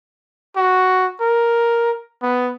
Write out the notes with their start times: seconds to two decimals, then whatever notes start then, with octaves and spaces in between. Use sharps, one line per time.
0.57 F#4
1.21 A#4
2.22 B3